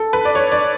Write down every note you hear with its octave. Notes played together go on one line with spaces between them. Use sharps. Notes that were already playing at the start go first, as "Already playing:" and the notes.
Already playing: A4
B4
D5
C#5
D5